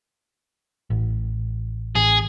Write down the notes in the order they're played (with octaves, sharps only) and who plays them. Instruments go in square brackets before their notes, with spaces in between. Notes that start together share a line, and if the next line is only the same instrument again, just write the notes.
[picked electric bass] A1
[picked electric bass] A1 [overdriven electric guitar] G#4